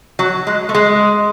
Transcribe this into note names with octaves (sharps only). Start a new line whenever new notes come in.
F#3
G#3
A3
G#3